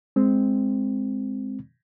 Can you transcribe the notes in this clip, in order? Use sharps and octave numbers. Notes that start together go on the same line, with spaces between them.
G#3 C4